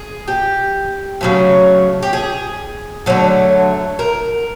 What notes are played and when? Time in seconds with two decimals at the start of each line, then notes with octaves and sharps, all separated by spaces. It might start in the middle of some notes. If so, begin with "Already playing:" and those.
Already playing: G#4
0.28 G4
1.21 C#3 F#3 A3
2.03 G4
2.13 G#4
3.06 D3 F#3 A3
3.99 A#4